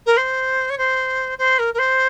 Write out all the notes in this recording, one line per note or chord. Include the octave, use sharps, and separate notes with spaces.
A#4
C5
C#5
C5
C5
A#4
A#4
C5